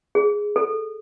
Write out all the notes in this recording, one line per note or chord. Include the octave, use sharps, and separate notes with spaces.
G#4
A4